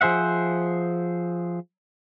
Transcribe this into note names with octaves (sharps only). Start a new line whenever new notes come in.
F3 G#4 C5 E5 F#5